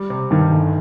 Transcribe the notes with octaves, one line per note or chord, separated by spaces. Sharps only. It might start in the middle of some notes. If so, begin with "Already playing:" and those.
Already playing: G3
C3
G2 D#3
G1